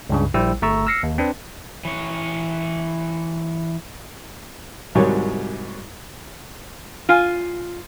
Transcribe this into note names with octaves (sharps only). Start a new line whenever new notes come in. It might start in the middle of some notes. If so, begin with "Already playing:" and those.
C#2 G2 C#3
A#1 G3 E4 C5 G5 E6
G1 A3 A#5 C#6 E6
E6 F6 A#6 C7 C#7
D#2
C4 D4 B4
E3 C#5
C2 G#2 D#3 F#3 G3 C#5
F4 G#5